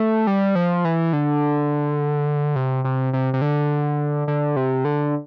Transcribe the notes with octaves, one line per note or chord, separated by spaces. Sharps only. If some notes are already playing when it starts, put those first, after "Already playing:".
Already playing: A3
G3
F3
E3
D3
C3
C3
C3
C3
D3
D3
C3
D3